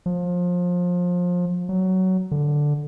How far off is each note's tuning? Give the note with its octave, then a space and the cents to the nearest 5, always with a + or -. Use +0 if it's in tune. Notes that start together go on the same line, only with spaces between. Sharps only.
F3 +25
F#3 +15
D3 +0